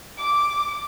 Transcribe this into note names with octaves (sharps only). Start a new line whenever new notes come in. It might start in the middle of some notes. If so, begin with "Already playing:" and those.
D6